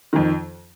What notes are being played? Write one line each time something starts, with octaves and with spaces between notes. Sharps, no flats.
F2 D#3